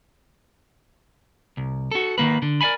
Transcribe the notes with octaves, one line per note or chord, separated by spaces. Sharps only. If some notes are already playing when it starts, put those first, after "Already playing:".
C2
F#4 A4
D#3 E3 A#3 B4
D3
A#4 D5 F5 G#5 B5